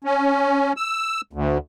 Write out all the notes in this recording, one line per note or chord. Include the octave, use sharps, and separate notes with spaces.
C#4
E6
D2